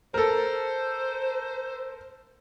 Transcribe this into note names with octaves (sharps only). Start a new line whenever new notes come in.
A4 A#4 C5